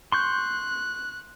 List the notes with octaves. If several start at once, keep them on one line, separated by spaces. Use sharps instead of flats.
C6 C#6 F#6 G6